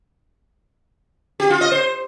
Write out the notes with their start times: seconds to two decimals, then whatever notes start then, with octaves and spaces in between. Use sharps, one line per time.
1.40 G4
1.50 F4
1.61 D#5
1.72 C5